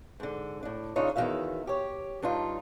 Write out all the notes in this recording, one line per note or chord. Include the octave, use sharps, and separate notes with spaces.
G#2 D3
A2 D4
C#3 D4 D#4 F4 C#5
E2 D#3 F#3 F#4 E5 F5
G4 C#5
G2 D4 D#4 F4